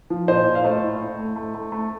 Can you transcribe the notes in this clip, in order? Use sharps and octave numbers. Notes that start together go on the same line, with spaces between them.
F3
A#2 C5 D#5
A#2
F5
A3 C5 D#5
A2
A3
A3
A3
A3
A3